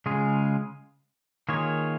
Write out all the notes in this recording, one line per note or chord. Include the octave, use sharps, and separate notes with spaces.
C#3 G#3 F4 G#4
D#3 A#3 F4 G#4 C#5